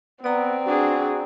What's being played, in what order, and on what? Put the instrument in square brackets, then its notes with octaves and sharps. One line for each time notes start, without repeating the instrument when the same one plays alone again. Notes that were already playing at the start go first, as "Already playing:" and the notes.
[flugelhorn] B3 [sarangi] C4 [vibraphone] D5 A#5
[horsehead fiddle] D4 G#4 [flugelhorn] F#4